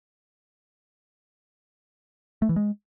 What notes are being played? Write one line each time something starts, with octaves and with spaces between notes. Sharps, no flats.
A3
E3
G#3